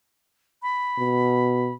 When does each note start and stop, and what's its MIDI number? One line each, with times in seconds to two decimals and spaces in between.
0.63 1.73 83
0.98 1.73 47